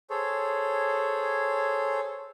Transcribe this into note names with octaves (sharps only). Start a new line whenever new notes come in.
G#4 A4 C5 C#5